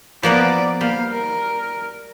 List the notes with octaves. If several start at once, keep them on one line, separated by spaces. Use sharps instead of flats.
F3 A#3 B3 D5 F#5
G3 A#3 F5
A#4